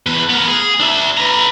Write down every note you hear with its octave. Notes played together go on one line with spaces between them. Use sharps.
E2 B4
B3 A#4
G#4
D4 E5
B4 A#5